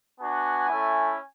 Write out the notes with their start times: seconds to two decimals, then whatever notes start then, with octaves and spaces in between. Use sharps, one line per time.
0.20 B3 D4 F#4 G#5
0.69 A3 C#4 E4